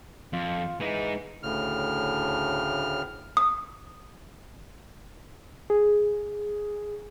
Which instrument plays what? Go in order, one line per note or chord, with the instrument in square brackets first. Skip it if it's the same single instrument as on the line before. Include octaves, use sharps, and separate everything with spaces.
[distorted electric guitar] F2 [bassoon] F4
[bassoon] E3 [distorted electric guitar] G#3 D#4
[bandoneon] D2 A2 C#3 F6
[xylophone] D#6
[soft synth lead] G#4